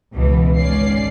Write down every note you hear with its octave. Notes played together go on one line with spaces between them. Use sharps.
C#2 B2 E3
G#1 C#2 C#4 D5 C7